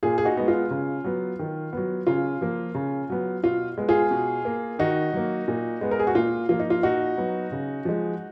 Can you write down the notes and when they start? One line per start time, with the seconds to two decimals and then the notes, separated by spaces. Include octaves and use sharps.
0.03 A#2 F4 G#4
0.18 G#4
0.25 D#4 F#4
0.37 G#3 B3
0.48 F4
0.70 C#3
1.04 F#3 B3
1.39 D#3
1.73 F#3 B3
2.07 C#3 F4
2.41 F3 A#3
2.75 C#3
3.10 F#3 B3
3.43 B2 F4
3.78 G#3 B3
3.88 F4 G#4
4.11 B2
4.45 A#3
4.79 D#3 D#4 F#4
5.13 F#3 A#3
5.48 A#2
5.81 G#3 B3
5.91 A#4
5.99 G#4
6.07 F#4
6.15 A#2 F4
6.49 F3 A#3 F4
6.60 D#4
6.70 F4
6.83 A#2 D#4 F#4
7.17 F#3 B3
7.52 C#3
7.85 F3 G#3